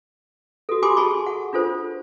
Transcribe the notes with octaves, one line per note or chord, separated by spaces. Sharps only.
F#4 A4
G4 A4 G#5 B5 C6 D6
F#4 G#4 A5 B5 C#6
F#5
D4 F4 A4 C5